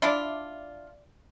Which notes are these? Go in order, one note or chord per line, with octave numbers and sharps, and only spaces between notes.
D4 E4 F4 D5 E5